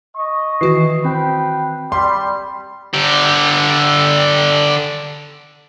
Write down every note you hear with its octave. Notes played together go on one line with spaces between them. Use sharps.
D#5 C#6
D#3 E3 F#4 C7
C4 B4 G5
G3 B5 C6
D3 G4